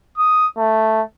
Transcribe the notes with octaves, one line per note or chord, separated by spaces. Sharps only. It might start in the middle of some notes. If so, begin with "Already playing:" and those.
D#6
A3